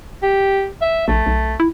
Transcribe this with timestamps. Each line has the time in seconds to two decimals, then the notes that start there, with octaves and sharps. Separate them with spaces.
0.23 G4
0.82 E5
1.08 A#1 A3
1.26 B1
1.60 E4